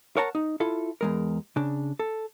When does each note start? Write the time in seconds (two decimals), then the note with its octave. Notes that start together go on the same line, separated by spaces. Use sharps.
0.17 A#4 C#5 F#5 A5 A#5
0.35 D#4
0.60 E4 F4 A4
1.01 E2 G#3 A#4
1.56 C#3 D4
1.99 A4